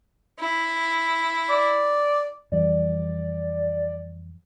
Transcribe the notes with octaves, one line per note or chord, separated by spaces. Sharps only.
E4
D5
F2 E3 G3 D5